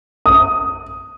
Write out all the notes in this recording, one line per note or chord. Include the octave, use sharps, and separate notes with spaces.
D#6